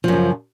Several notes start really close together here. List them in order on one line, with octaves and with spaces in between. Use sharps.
F3 F#2 C#3